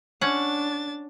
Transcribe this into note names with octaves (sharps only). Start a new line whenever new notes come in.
C#4 D4 F#5 A6